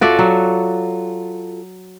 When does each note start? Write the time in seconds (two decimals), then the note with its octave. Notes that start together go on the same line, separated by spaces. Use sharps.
0.01 F4 F#4 A4 D5 E5
0.19 F#3